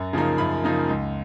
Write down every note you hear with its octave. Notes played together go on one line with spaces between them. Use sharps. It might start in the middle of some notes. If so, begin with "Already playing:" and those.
Already playing: F#2
C#3 F3 A#3 D#4
F#2 B5
C#3 F3 A#3 D#4
C#2